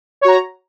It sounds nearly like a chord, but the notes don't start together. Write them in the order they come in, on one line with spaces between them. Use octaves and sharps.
C#5 F#4 A#5